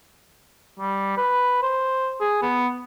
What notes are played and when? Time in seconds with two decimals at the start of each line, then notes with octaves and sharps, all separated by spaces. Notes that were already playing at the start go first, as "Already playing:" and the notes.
0.80 G3
1.17 B4
1.63 C5
2.21 G#4
2.42 B3